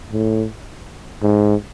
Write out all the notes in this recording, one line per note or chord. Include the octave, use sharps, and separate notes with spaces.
A2
G#2